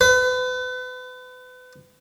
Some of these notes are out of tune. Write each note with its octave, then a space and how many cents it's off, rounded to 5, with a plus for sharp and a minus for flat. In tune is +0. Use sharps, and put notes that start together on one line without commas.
B4 +35